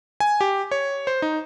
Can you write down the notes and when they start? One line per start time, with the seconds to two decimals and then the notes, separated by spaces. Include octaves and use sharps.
0.20 G#5
0.41 G4
0.71 C#5
1.07 C5
1.22 D#4